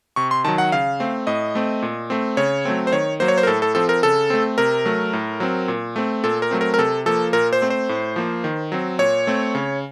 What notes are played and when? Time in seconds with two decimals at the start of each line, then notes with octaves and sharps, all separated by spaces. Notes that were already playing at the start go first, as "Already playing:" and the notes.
0.16 C3 C#6
0.31 C6
0.44 D#3 F#3 A5
0.58 F#5
0.72 C#3 F5
1.00 A3 C4
1.27 A2 D#5
1.55 A3 C4
1.82 A#2
2.10 A3 C4
2.37 C#3 C#5
2.65 F#3 A3 C4
2.87 C5
2.92 D#3 C#5
3.20 F#3 A#3 C5
3.28 C#5
3.38 C5
3.43 A#4
3.47 A2 A4
3.62 A4
3.75 F3 C4 A4
3.89 A#4
4.03 C#3 A4
4.30 A3 C4
4.58 C3 A#4
4.85 F#3 A3
5.13 A2
5.40 F#3 C4
5.68 A#2
5.96 A3 C4
6.24 A#2 A4
6.42 A#4
6.51 F#3 A3 C4
6.61 A#4
6.74 A#4
6.78 C3 A4
7.06 F3 A#3 A4
7.33 A#2 A#4
7.53 C5
7.62 A3 C4
7.70 C5
7.89 A2
8.16 F3 A#3
8.44 D#3
8.72 F#3 C4
8.99 A#2 C#5
9.27 A3 C4
9.55 C#3